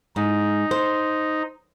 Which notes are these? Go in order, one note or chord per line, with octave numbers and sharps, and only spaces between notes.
G#2 D#4
C5